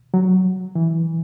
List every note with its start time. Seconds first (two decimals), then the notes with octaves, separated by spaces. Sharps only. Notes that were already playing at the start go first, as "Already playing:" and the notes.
0.14 F#3
0.75 E3